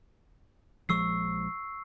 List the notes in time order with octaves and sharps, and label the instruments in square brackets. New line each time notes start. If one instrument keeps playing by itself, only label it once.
[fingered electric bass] A#1 F3 G#3 [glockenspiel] C#6 E6 C7